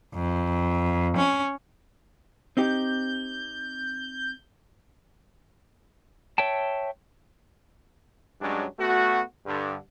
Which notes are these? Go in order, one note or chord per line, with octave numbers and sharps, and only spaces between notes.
F2
C#4
C4 D#4 G4 G6
C#5 E5 G5 A5
G2 F#3 G#3 C#4 D4
A3 B3 F#4
G2 D3